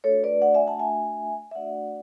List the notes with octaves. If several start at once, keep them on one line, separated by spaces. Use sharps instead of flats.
A3 D4 F#4 A4 C#5
B4 D5
D5 F#5
E5 G#5
F#5 A5
E5 G#5
E5
A3 D4 F#4 D5 F#5